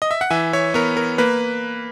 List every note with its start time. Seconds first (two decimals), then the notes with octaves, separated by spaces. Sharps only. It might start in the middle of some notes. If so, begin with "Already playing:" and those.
0.02 D#5
0.11 E5
0.21 F#5
0.30 E3 E5 G#5
0.53 C#5 E5
0.74 B3 A#4 C#5
0.97 A#4
1.18 A#3 B4